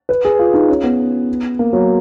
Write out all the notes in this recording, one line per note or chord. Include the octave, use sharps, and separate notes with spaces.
B4
G#4
F4
D#4
C#4
B3
A#3
F#3